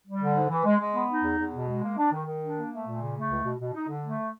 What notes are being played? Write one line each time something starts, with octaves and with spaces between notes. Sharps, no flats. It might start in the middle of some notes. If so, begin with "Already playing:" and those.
G3
D3
G#2
E3
G#3
G#3
B3
D#4
E2
E2
B2
G#3
A#3
D4
D#3
D#3
D4
A#3
A3
A#2
C#3
A3
C#2
B2
B2
D#4
D3
A3